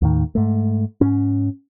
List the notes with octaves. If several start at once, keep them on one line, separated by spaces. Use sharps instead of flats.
D#2 A2 D#3
G#2 A3
G#2 C#4